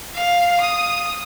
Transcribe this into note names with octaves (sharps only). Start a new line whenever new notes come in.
F5
D#6